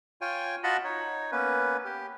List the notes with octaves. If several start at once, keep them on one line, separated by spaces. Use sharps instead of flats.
F4 C#5 G5 G#5
F4 F#4 D#5 F#5 A5 B5
D#4 C#5
A#3 B3 C#4 B4
G4